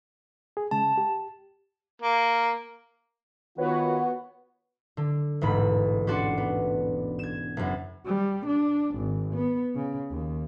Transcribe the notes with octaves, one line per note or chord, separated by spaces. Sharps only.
G#4
C#3 G#3 A5
G4
A#3
D#3 B3 F4 F#4 B4 C#5
D3
E1 A1 G#2 B5
C#4 D4 F#4 D5 C6 C#7
B3
G#6 E7
F#1 F#2
G3
D4
G#1
B3
C#3
D#2